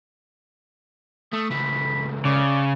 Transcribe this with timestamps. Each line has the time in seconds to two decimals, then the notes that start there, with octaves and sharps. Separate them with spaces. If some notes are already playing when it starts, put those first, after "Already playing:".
1.33 A3 D#6
1.50 C#2 A3 B5
2.25 C#3 D5